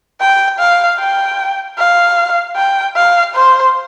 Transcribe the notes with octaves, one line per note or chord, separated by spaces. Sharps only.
G5
F5
G5
F5
G5
F5
C5